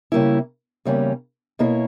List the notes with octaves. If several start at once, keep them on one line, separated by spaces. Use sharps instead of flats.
C#3 G3 A#3 E4
E2 C#3 G3 A#3 C#4
B2 A#3 E4 A#4 C#5